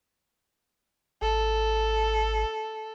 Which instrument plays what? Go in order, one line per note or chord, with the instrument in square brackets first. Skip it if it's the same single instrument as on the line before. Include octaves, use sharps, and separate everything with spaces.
[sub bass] G#1 [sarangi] A4